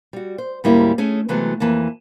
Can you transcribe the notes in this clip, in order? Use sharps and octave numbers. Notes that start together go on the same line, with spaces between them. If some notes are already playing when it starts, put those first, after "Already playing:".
G3 F#4
C5
D2 G#2 G3 A#3 C#4 E4
A3 C#4 G#4
C3 E3 F#3 G#3 A3 B3
F2 E3 A#3 A5